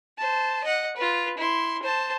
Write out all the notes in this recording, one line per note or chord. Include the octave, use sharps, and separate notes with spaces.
C5 A5
D#5 F#5
F4 B4
E4 C6
C5 A5